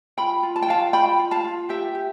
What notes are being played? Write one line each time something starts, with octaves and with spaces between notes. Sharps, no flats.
F4 G5 B5
F4
A5
G5
F4 F5 A5
F4 G5 B5
F4
F5 A5
F4
G4 E5 G5
G4